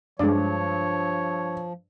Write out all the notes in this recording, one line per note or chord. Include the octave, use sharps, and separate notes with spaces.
G2 F3 G#3 C#5 D5